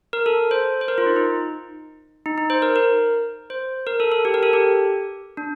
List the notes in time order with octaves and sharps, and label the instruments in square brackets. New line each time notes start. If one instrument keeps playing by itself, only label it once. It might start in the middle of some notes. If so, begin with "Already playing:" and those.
[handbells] A#4
A4
C5
C5
A#4
F4
D#4
D#4
D#4
D#4
C5
A#4
A#4
C5
A#4
A4
A4
G4
A#4
A4
G4
D4